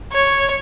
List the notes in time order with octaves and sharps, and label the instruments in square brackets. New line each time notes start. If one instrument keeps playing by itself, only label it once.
[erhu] C#5